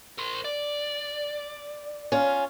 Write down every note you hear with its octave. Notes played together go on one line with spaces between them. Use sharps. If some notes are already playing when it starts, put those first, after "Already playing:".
A#4 C5
D5
C#4 F4